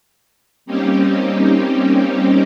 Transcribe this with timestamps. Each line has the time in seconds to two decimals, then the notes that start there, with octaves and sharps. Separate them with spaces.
0.66 G3 A#3 C4 C#4 D#4 G4